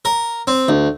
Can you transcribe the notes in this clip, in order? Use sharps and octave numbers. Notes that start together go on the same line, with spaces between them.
A#4
C4
D2